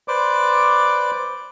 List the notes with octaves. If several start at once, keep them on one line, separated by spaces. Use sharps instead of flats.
B4 C5 D5 D6